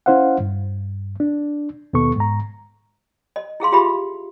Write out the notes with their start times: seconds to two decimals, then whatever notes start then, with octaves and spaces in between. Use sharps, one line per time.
0.06 C#4 E4 C5 F5 F#5
0.40 G2
1.20 D4
1.93 D#2 B2 B3 A4 C#6
2.16 G#2 A#5
3.36 D#5
3.60 E4 G#4 F5 C6
3.72 F4 G4 G#4 E5 F5 B5